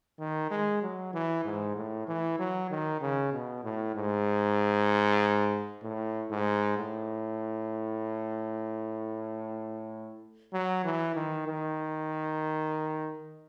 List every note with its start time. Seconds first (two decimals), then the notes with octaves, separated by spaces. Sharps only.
0.19 D#3
0.51 G#3
0.82 F#3
1.13 E3
1.45 G#2
1.76 A2
2.07 E3
2.39 F#3
2.70 D#3
3.01 C#3
3.32 B2
3.64 A2
3.95 G#2
5.83 A2
6.31 G#2
6.78 A2
10.53 F#3
10.84 E3
11.15 D#3
11.47 D#3